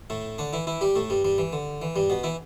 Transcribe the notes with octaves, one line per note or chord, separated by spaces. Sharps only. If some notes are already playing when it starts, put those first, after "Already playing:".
A2 A3
D3 D4
E3 E4
E3 E4
G3 G4
A2 A3
G2 G3
G2 G3
E3
D3
E3
G2 G3
B2 B3
E3 E4